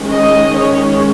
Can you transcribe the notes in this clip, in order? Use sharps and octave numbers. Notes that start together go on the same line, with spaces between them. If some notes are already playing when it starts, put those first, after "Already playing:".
Already playing: D#3 G#3 C#4
D#5
C#5